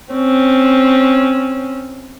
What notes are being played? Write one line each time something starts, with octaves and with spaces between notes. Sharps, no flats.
C4 C#4